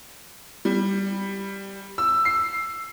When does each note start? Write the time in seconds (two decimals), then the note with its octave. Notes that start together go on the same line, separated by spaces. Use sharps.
0.65 G3
1.98 E6
2.25 C7